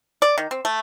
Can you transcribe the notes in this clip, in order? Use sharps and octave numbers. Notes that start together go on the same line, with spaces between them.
D5
D#3
C4
A3